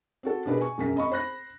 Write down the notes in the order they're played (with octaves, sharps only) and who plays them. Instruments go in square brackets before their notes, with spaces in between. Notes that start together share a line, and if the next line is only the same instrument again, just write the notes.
[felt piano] C4 F#4 A4
B2 D4 G4 G#4 A#4 B4
G#5 C#6
E1 F#2 A#4 G#5 B6
G#1 D#5 B5 C#6
C5 B5 F#6 A#6